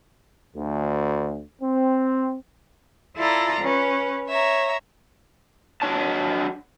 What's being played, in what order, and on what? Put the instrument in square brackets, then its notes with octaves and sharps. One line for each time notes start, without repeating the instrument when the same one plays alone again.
[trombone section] D2
C4
[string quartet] E4 F4 A4 D5 A#5
C#4 B4
C#5 E5 A#5
[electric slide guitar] F#3 D4 C#5 A5